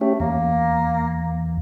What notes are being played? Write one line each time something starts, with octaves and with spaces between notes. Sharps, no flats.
A3 C#4 G4
E2 A#3